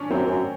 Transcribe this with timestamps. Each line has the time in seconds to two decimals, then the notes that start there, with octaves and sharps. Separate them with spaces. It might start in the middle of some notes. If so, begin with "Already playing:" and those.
Already playing: C#4 D4
0.10 F#2 C4
0.26 F#2